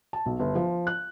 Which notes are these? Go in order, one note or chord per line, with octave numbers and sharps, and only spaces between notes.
A5
B1
G1
F3
F#6